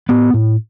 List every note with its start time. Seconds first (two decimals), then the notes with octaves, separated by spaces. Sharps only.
0.09 A2 B3
0.34 A2